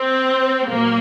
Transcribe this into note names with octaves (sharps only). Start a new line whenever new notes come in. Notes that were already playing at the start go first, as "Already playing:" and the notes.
Already playing: C4
A#2 F#3 A#3